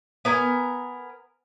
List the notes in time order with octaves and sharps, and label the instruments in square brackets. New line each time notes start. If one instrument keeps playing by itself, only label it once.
[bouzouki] B3 A#4 G#5